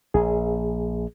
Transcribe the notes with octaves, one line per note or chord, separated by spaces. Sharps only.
A#1 G#4